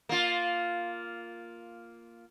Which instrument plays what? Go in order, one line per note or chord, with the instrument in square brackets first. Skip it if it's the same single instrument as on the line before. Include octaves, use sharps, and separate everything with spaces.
[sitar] A#3 F4